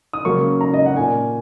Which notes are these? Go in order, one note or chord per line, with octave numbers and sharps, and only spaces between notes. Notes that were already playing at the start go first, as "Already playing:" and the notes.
D#6
C#3 F#3 A#3 C#6
A#5
D#5
F#5
A#2 A#3 G#5